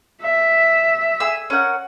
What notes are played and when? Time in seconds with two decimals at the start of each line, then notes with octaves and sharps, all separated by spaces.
0.22 E5
1.20 G#4 E6
1.50 C#4 A#4 F#5